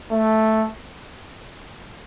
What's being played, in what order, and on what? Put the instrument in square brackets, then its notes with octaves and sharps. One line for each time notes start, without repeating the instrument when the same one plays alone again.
[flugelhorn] A3